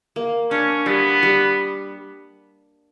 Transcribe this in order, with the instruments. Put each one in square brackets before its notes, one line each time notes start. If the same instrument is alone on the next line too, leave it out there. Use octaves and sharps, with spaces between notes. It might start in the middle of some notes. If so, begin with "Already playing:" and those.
[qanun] A#3
[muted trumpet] C#4 [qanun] D4
[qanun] G3 [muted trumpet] B3
[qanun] G3